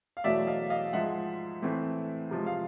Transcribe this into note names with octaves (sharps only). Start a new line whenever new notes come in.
F5
E2 B2 F#3 A3 D5 E5
D#5 F5
D#5 F5
G#2 F3 G#3 E5 F#5
A2 E3 A3 C4
C3 F3 G#3
F5